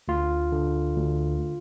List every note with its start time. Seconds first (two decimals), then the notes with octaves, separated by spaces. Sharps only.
0.08 D2 F4
0.52 D3
0.96 D2